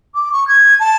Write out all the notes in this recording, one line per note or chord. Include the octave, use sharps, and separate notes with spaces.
D6
C#6
G#6
A5